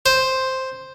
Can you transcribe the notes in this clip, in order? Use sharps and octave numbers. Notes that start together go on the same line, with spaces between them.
C5